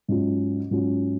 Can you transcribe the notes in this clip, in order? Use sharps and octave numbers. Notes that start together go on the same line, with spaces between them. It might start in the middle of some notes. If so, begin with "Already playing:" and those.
G#2 F#3 C#4 F4
G#2 F#3 C#4 F4